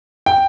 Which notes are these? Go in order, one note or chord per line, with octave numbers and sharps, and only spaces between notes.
G5